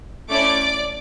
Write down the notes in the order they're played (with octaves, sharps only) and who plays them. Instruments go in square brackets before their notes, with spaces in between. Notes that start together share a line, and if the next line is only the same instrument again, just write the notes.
[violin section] A3 C#4 E4 D5 D6